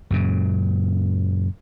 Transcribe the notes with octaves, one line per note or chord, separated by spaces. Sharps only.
F#2 A#2 C#3